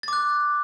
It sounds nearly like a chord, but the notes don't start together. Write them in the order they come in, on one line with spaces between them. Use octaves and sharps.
A6 D6 F#6